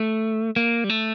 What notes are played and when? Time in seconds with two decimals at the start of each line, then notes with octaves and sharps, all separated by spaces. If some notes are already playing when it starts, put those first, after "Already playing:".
Already playing: A3
0.56 A#3
0.84 G3
0.90 A3